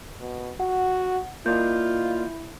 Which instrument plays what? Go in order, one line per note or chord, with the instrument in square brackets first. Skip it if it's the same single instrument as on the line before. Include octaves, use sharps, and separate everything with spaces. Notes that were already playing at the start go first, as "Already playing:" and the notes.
[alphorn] B2
[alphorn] F#4 [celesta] F#5
[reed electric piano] A#3 D5 D#5 [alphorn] E4 [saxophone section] F4 [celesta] G6